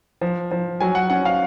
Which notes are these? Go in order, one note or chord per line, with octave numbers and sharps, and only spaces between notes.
F3
F3
F#3 G#5
F#5
C#4 F#5
F5